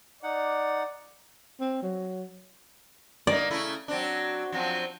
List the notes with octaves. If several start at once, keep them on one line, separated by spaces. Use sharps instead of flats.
D#4 D5 F#5
C4
F#3
A#3 D#4 D5
C#3 A3 E4
F#3 C4 D4
F3 F#3 C4